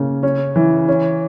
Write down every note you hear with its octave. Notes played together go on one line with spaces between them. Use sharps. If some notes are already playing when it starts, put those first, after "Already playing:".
Already playing: C#3 A#3
C#4
E3
C#4